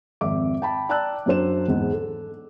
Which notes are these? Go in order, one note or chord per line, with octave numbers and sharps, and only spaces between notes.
G#1 F2 E5 D6
G5 A5 B5
D5 G5 A5 A#5 E6 F#6
F#2 F#3 D4 C5 E7
E2 G#2
A4